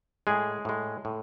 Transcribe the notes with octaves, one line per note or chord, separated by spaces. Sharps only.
A2 G#3 G#4
A2 G#3
A2